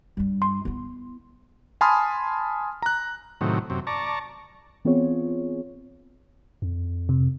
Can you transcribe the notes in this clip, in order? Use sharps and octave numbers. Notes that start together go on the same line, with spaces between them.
G2 G3
C6
B3 E4
G#5 A5 B5 C6 D#6 F6
A#5 F#6
A2 C3 D#3 F#3
F#2 C3
D5 A5 A#5 C#6
E3 B3 C4 F4 G#4 C#5
F2
C3